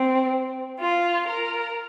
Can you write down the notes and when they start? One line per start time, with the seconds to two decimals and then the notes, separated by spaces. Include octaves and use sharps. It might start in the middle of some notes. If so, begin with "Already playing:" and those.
Already playing: C4
0.81 F4
1.28 A#4